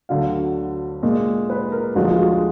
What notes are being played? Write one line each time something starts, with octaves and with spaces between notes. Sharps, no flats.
D2 D3 F#3 F5
A#2 G#3
B4
A#4
D2 D3 F3 G#3 F#4
F4
F#4
G#4